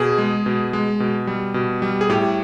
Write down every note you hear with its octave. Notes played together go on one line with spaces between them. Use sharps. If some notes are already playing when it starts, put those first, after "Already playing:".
Already playing: B2 G#4
G#3
B2
G#3
B2
G3
B2
G3
G#4
A2 G4